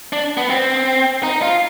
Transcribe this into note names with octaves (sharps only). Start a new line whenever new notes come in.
D4
B3
C4
D#4
F4